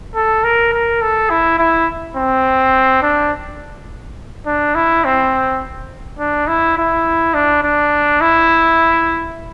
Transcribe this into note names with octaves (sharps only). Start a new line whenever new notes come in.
A4
A#4
A#4
A4
E4
E4
C4
D4
D4
E4
C4
D4
E4
E4
D4
D4
E4